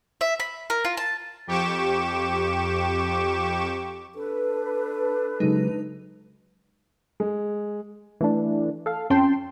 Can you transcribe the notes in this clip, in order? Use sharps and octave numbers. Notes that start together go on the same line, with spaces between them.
E5
B5
A#4
F4
A5
F2 G4 C#6 D6 E7
D4 A4 B4
C#3 F#3 G#3 D#4
G#3
E3 A3 D4
A4 F5
F2 C#4 G5 A5 C6